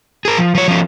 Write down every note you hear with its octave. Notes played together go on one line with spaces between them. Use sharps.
G#4 A#4
F3
F3 C#5
F3 C#4